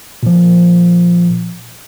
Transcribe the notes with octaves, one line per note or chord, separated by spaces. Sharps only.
A#2 F3